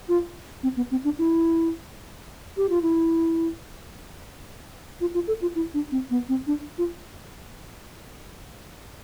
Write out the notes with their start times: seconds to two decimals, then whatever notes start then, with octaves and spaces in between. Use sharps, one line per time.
0.09 F4
0.63 C4
0.77 B3
0.91 C4
1.04 D4
1.18 E4
2.57 G4
2.70 F4
2.82 E4
5.01 F4
5.14 F4
5.28 A4
5.42 F4
5.55 E4
5.74 D4
5.92 C4
6.11 B3
6.29 C4
6.47 D4
6.78 F4